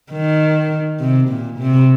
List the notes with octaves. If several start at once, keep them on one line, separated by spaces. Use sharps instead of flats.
D#3
C3
A#2
C3